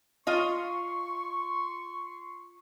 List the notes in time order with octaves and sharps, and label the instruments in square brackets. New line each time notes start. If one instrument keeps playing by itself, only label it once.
[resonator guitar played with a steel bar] F4 D#5 [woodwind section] C6 C#6